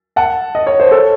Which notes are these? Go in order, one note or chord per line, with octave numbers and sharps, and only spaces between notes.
F#5 A5
D#5
C#5
C5
A4 C#5